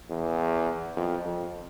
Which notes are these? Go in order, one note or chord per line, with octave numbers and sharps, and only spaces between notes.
E2
F2
F2